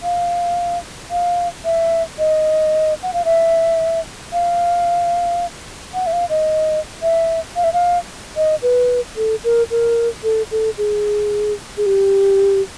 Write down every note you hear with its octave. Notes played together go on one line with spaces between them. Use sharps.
F5
F5
E5
D#5
F#5
F5
E5
F5
F#5
E5
F5
D#5
E5
F5
E5
F5
D#5
B4
A4
A#4
A#4
A4
A4
G#4
G#4
G4